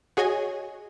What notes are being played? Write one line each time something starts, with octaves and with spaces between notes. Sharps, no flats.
F#4 G#4 C#5 D#5 G#5